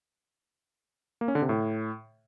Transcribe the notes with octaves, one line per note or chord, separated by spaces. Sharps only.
A#3
C#4
D3
C3
A2